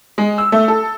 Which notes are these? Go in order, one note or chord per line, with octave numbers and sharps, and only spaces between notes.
G#3
E6
A3
A4